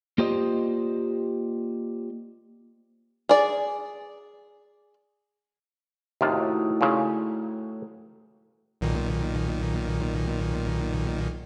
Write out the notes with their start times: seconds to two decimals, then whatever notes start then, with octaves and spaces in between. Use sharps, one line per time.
0.18 A#3 F4 G4 C5 D5 D#5
3.29 G#4 D5
6.21 D#2 A2 C3 D#4 F4 F#4
6.81 A#2 C#3
8.81 B1 A#2 D#3